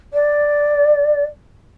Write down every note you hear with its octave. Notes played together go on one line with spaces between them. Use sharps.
D5